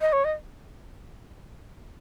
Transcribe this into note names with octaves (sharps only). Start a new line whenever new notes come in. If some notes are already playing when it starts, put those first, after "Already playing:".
D#5
C#5
D#5